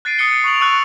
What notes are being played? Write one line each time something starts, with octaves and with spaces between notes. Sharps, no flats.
F#6 A6 C7 D7 D#7
D#6 F#6 C#7 G7
C#6 D7 F7 F#7
C#6 E6 F#6